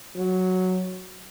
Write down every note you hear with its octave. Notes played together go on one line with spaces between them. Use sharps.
F#3